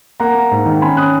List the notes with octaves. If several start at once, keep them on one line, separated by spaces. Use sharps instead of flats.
A#3 F#5 A#5
A#3
G#2
D#3
C#4 G#5 B5
C#4 D#6 F#6